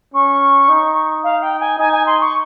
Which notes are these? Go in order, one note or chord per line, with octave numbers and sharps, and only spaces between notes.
C#4 C#6
D#4
F5
G5
G#5
D#4 G#5
G#5
C6
C#6